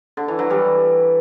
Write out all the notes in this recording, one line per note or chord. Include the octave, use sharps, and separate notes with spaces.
D3
E3
F#3
E3 G3